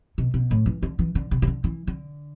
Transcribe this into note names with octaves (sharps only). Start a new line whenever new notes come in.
B2
B2
A2
E3
D3
E3
D3
C3
C3
D3
E3
D3